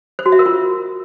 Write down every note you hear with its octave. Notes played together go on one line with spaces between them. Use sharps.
C5
F#4
E5
A#4
F4